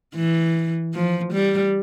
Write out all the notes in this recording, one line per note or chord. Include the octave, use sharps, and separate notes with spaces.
E3
F3
G3